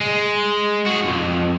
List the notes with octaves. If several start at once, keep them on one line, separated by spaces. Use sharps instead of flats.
G#3
F#4 G#4
B1 F2